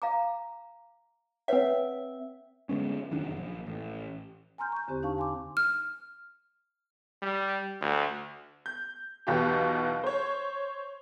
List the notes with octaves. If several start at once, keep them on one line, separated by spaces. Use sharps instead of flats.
F5 A#5 D6
C4 B4 C#5 E5 F#5
D3 G#3 B3 C#4
F1 F#2 D#3 D4
A#1
A1
G#5 A#5 C6 F6 G6
C#6 G6
E2 D3 C4 G4 C5
D4 D#4 F5 A5 C#6
G#5 C6 D6
F6
G3
D2
G6
B1 E2 B2 F4 G4
C5 C#5